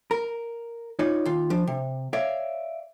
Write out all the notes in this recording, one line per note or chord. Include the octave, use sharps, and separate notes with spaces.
A#4
D#4 F4 C#5 D5
D#2 F4
F3 D4
C3
C#5 D5 E5 F5